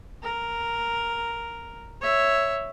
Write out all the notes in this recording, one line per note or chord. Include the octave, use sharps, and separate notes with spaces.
A#4
C#5 E5